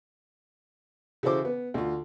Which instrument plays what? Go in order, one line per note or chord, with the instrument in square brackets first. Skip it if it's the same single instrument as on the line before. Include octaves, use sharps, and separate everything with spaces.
[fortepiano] C#3 E3 F#4 A4 C5 D6
B3
D2 F4